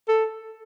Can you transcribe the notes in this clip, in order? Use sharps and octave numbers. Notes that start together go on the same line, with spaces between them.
A4